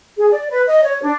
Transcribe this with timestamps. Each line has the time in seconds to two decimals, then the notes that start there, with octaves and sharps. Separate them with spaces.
0.18 G#4
0.31 D5
0.50 B4
0.67 D#5
0.84 C#5
1.02 D4